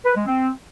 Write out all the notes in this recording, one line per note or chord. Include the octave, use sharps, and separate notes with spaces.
B4
G#3
C4